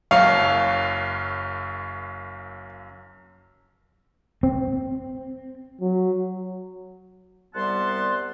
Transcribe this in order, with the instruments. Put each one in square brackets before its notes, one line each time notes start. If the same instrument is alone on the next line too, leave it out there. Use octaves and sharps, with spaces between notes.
[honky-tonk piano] F#1 F#2 C#5 [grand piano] F5
[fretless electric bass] C4
[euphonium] F#3
[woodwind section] C2 G3 B3 F#5 A5 C6